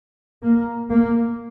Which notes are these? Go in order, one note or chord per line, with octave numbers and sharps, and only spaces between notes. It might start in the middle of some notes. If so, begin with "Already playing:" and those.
A#3
A#3